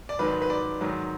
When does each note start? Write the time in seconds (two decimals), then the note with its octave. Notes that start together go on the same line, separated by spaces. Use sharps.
0.09 D5
0.19 G#2 D#3 F#3 B4
0.42 B4
0.50 D5
0.81 G#2 D#3 F#3